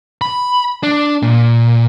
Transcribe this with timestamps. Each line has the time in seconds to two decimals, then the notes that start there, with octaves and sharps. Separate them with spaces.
0.21 B5
0.83 D4
1.22 A#2